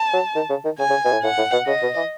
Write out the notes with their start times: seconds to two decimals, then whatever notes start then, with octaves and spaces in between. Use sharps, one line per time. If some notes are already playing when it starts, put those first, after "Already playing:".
Already playing: A5
0.13 F#3
0.35 D#3
0.50 C#3
0.65 D#3
0.79 C#3 G#5
0.90 C#3
1.05 B2
1.12 A2
1.23 A2 F#5
1.38 A2
1.52 B2
1.67 C#3 D#5
1.82 B2
1.96 E3